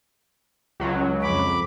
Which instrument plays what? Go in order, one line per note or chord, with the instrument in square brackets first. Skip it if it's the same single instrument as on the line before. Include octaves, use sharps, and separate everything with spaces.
[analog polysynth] C#2 F#3
[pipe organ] F2 B5 D6